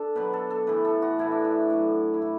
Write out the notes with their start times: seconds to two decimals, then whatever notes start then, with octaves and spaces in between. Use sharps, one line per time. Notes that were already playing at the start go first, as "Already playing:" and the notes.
Already playing: D4 A4
0.15 B2 F#3 B4
0.33 A4
0.50 A4
0.67 A2 E3 B4
0.85 A4
1.02 F#4
1.19 A2 E3 E4
1.32 D4
1.45 E4
1.70 A2 F#3
2.14 E4
2.22 A2 F#4